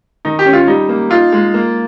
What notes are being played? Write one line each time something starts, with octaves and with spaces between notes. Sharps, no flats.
D#3 D#4
G4
C#4
F4
G3 D#4
A#3
D#4 F4
G#3
A#3